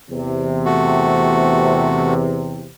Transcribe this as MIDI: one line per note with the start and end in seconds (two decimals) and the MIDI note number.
0.11 2.70 40
0.11 2.70 48
0.65 2.14 57
0.65 2.14 66